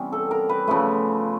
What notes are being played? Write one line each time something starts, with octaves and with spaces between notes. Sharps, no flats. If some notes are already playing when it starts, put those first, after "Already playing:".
Already playing: C3 E3 G3 B3 C#4
A4
A#4
B4
C#3 F3 A3 B4